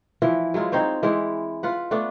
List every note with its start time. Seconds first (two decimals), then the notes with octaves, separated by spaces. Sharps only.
0.22 E3 F3 E4
0.54 F#3 G#3 E4 F4
0.72 C4 D#4 C5 C#5
1.03 E3 G#3 C4 E4
1.63 F4 B4 F#5
1.91 A3 B3 D4